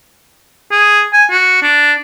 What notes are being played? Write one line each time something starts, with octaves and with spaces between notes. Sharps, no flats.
G#4
G#5
F#4
D4